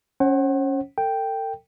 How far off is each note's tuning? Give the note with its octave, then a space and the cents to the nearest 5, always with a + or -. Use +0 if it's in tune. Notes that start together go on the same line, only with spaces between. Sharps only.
C#4 +0 C5 +45 F#5 +30
A4 +40 G5 +0